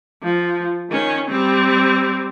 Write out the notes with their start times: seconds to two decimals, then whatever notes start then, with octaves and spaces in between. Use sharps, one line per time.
0.23 F3
0.90 D#3 C#4
1.30 G3 C4